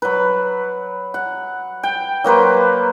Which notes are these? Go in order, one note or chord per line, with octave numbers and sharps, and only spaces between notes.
F#3 B4
F#5
G5
F#3 A#3 B4 C5